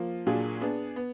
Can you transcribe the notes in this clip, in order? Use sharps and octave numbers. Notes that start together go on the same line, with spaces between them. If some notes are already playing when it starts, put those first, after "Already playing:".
Already playing: F3 A#3
A#2 F#3 D4 F4 G#4
B3 D4 G#4
B3